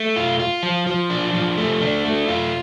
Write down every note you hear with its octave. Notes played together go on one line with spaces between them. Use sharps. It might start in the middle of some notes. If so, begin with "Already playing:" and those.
Already playing: A3
F4
F4
F3
F3
D4
F3
A3
D4
A3
F4